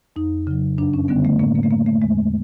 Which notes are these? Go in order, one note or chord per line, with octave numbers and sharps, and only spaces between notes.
F2 D#4
C#3 F#3
F#2 D4
C#4
D3 G3 B3
A3
A2 A#3
A#3
A3
F3 A#3
A3
E2 G#3